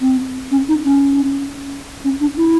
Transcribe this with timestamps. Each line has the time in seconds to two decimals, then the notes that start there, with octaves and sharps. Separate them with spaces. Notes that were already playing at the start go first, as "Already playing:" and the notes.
0.01 C4
0.51 C#4
0.69 D#4
0.85 C#4
2.04 C#4
2.21 D4
2.37 E4